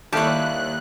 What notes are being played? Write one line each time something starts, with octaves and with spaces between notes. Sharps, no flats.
D#2 G3 E4 G4 A4 C#5 F5 F#6